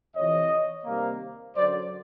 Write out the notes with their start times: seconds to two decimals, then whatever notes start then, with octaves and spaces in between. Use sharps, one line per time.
0.14 F2 C3 E3 C#5 D#5
0.84 C3 D#3 G3 A#3
1.54 F#2 D3 F#3 C5 D5